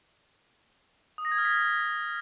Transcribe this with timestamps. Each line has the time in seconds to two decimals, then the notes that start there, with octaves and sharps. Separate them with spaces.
1.18 D#6
1.25 A#6
1.32 G#6
1.38 F6
1.45 B6